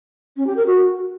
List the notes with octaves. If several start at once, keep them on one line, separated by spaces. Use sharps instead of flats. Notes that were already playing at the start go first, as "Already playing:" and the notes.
C#4
G4
A#4
F#4